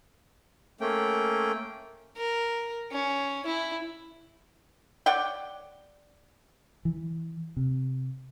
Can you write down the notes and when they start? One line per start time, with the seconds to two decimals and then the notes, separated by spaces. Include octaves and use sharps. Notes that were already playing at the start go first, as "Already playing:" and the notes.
0.81 A3 A#3 C#4 G5
2.17 A#4
2.92 C#4
3.46 E4
5.06 C#5 D5 F#5 G5
6.85 E3
7.57 C3